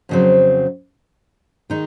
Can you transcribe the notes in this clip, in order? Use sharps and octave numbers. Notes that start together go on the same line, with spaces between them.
F2 C#3 F#3 C4
D#3 G#3 D#4